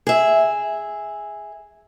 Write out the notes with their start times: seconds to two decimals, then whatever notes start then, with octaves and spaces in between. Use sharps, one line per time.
0.07 G#4 E5